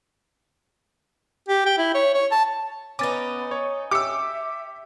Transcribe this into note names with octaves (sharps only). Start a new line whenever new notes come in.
G4
G5
E4
C#5
C#5
A5
B3 C#4 D#4 D6 A6
C#5
G4 E5 D6 E6 C#7